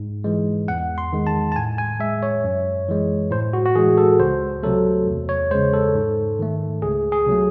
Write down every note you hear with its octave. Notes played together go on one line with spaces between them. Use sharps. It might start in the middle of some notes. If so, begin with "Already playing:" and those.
Already playing: G#2
E3 G#3
E2 F#5
C6
D#3 G#3
A5
A5
A2 G#5
G#5
G#3 E5
C#5
F#2
E3 G#3
A2 C5
F#4
F#4
E3 G#3 G#4
A4
C#2 C5
C3 F#3 A3 A4
E2
C#5
C#3 G#3 C5
A4
G#2
D#3 A3
C#2 G#4
G#4
C3 F#3 A3